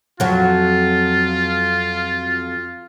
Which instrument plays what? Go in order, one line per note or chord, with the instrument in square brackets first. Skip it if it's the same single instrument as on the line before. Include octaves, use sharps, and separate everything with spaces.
[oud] F2 F#3 [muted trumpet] F4